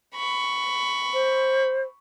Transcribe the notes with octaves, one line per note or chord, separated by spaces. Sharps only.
B5 C#6
C5